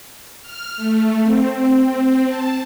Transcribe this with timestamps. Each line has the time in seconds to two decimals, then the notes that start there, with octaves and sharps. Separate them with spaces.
0.42 F6
0.77 A3
1.23 C4
2.27 A5